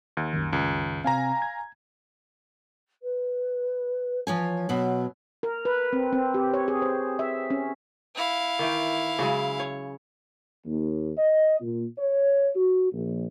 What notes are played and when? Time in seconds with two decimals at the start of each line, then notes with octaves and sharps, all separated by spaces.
0.17 D#2
0.33 C2 F#2 D#3
0.53 C#2
1.04 C3 C4 F5 G#5 A#5
1.42 G#6
3.02 B4
4.27 E3 F3 C#5 G#5
4.69 B2 F#3 C#5
5.43 A#4
5.65 B4
5.93 C4
6.13 C4
6.34 G4
6.54 C#5
6.68 G#4
6.82 C5
7.19 E5
7.50 C#4
8.15 E4 F5
8.59 D#3 E3 G5
9.19 C#3 F#3 G#3
9.60 C#5
10.66 D#2
11.18 D#5
11.61 A#2
11.98 C#5
12.56 F#4
12.92 A#1